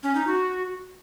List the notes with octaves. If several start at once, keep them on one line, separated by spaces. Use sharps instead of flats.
C#4
D#4
F#4